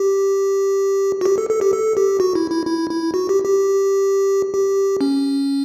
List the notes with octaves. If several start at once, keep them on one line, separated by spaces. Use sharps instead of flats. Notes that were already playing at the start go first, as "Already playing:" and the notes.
Already playing: G4
F#4
G4
A4
A4
G4
A4
G4
F#4
E4
E4
E4
E4
F#4
G4
G4
G4
C#4